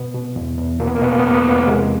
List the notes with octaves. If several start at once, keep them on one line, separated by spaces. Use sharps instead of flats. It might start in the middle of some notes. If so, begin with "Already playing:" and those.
Already playing: B2 B3
B2
E2
E2
B2 A#3
B3
A#3
B2 B3
A#3
B3
E2 A#3
B3
A#3
E2 B3
A#3
C3 G#3